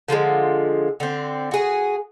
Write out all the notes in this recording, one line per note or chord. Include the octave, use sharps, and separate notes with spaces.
D3 F3 G3 G#3
D3 C4
F#4 G#4